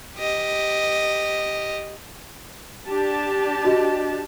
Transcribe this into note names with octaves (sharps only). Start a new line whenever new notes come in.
G4 D#5
D4 G4 A5
F#4 D#5